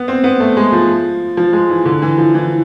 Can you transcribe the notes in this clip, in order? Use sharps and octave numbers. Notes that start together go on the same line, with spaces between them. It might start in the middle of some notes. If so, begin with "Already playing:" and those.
Already playing: B3
C4
B3
A3
G#3
F3
F3
G#3
E3
D3
E3
F3
E3